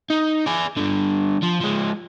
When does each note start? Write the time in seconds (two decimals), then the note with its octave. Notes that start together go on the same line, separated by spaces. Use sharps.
0.10 D#4
0.46 G#4 D5
0.77 G2 D3
1.42 F3
1.60 F3 G#3